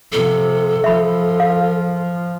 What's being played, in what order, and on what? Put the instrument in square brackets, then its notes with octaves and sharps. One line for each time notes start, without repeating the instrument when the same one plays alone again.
[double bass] C3 F3 [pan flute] A4
[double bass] F3 [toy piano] E5 B5
[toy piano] F5